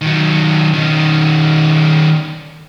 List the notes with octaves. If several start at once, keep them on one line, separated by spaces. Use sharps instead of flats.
D#3 F#3
D#3 C#4